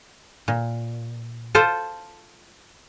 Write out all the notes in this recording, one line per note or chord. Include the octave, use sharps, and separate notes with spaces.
A#2
F4 A4 C5